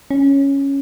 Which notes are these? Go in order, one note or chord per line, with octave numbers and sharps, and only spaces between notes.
C#4